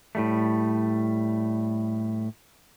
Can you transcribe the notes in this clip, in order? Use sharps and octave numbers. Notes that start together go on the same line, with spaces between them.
A2 G3 A3